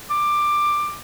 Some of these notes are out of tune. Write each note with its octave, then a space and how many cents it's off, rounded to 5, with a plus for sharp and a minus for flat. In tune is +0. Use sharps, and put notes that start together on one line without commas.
D6 +15